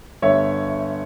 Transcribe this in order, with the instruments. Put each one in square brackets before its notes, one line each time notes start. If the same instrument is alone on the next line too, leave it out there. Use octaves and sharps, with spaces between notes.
[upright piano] G1 C#5 E5